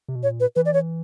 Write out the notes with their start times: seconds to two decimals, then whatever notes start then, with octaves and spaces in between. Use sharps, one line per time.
0.08 C3
0.15 B2
0.23 A#2 C#5
0.40 B4
0.56 E3 B4
0.66 D5
0.74 C#5